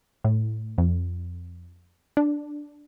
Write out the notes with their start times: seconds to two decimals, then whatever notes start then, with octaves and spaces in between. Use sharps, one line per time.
0.24 A2
0.78 F2
2.17 D4